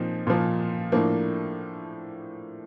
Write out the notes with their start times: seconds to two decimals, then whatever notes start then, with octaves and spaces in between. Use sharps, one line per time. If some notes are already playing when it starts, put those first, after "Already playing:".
Already playing: A#2 F3 C4 D#4
0.27 A#2 F3
0.92 A2 F3 A#3 D4